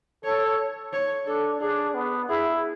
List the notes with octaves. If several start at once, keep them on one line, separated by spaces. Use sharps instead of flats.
A4 C#5
C#5
D4 A4
D4 G#4
B3
E4 G#4